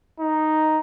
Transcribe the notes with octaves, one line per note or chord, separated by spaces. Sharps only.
D#4